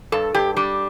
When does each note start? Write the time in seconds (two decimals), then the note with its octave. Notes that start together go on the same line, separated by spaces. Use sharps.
0.12 G2 A4
0.34 G2 G4
0.56 G3 D4